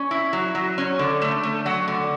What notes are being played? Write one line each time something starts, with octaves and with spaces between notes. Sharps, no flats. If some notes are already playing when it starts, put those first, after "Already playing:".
Already playing: C#4
E4
F#3
F#3
C#4
D3
A3
A3
F#3 F#5
D3